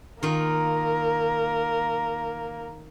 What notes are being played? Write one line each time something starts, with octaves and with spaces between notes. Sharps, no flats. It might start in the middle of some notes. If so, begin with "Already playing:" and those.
D#3 A#3 F4 A#4